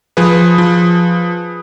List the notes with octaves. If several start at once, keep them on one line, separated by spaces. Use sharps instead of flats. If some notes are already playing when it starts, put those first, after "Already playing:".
F3 G#4 B4
F3